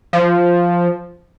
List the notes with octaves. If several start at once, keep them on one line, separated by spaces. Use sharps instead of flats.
F3